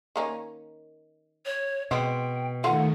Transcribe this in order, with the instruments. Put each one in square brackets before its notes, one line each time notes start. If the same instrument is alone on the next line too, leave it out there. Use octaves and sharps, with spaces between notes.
[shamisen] D#3 A#3 C#4
[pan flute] C#5
[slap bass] B2 [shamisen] G#3 B3 C4 [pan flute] G5
[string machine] D#3 A3 [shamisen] F4 A4 F5 [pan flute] F#5